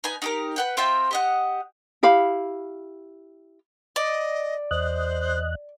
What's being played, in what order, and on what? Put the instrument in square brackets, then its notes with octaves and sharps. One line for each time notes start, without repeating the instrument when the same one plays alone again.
[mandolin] D#4 B4 G#5
D#4 G4 A#4
B4 F#5 G5
C4 F4 E5 G5
G4 D#5 F#5
[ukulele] E4 G4 F5 B5
[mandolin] D5 [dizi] D#5
[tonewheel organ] E2 D#5 F#6 [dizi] C5